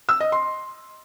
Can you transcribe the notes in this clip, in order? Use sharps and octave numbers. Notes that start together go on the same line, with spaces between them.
E6
D#5
C6